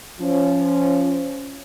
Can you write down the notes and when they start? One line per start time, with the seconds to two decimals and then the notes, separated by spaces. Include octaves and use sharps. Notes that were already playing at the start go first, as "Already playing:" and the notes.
0.21 F3 C#4